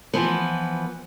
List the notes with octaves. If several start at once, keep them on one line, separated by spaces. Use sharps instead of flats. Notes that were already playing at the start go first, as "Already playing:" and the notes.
E3 F3 B3